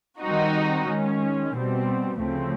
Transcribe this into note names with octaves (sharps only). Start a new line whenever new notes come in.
D#3 G3 C4 D#4 F#4
D#3 G#3 C#4
B2 G3 C4
D2 C#3 F3 A3 C4